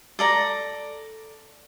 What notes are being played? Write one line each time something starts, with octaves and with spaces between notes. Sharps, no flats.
A4 D5 A#5